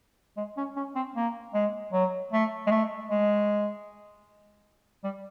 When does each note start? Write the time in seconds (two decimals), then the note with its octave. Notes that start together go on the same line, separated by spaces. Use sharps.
0.37 G#3
0.57 C#4
0.76 C#4
0.95 C4
1.16 A#3
1.54 G#3
1.93 F#3
2.33 A3
2.67 G#3
2.71 A3
3.10 G#3
5.04 G3